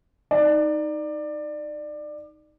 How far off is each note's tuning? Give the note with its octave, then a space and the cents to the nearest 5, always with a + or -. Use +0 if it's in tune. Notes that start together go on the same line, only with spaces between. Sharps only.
D#4 +0 D5 +20